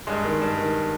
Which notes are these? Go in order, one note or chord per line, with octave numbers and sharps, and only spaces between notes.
G2 G#3
D#3
G2
D#3